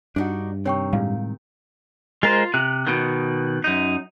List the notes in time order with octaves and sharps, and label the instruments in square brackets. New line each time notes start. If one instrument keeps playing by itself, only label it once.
[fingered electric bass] G2 [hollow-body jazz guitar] D4 D#4 F#4
[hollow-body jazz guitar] C3 D#3 [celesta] C#5 G5 C#6
[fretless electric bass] A2 G3 G#3 [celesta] F5
[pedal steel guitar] G#3 A#4 C5 [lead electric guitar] F4
[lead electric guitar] C3 [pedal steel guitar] F#6
[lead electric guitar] B2 D#3
F#2 D#4